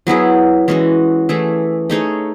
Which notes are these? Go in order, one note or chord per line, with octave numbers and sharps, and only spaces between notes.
F#3 B3 E4 G#4
E3 G#3 C#4 F#4
E3 A3 E4 G#4
A3 D#4 G#4 C#5